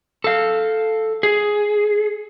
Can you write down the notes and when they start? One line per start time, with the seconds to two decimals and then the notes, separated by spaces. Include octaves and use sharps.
0.24 A4 F5
1.23 G#4